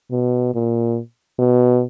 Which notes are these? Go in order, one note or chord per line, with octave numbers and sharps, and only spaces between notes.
B2
A#2
B2